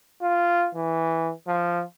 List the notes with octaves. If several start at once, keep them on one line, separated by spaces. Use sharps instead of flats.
F4
E3
F3